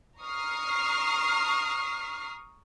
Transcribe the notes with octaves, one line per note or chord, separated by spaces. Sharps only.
A#5 C#6 D#6 F6 C7